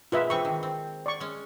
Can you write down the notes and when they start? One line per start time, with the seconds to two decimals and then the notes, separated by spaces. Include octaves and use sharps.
0.12 B2 G#3 A#3 F4 B4 E5
0.30 E3 C4 C#6
0.45 D#3
0.63 C4
1.06 D5 C#6
1.20 G#3 C#4